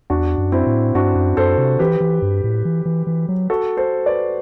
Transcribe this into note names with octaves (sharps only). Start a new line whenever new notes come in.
E2 D4 F#4
F#2
C4 E4
A2
G2 D4 F#4
F#2
F#2 A4 C5
C3
E3 G4 B4
E3
G2
A2
E3
E3
E3
F#3
F#4 A4
A4 C5
B4 D5